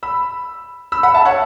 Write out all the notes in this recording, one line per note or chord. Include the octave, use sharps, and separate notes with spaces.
B5 E6
B5 E6
F#5 B5
E5 A5
C#5 F#5